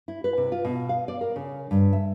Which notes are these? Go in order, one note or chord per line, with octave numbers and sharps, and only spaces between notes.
E4
B4
C3
F4
B2
F5
D5
A#4
C#3
G2
E5